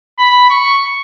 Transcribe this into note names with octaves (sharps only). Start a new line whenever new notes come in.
B5
C#6